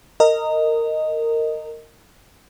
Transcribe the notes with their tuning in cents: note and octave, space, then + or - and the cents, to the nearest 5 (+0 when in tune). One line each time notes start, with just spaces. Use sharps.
A#4 -20 D#5 +0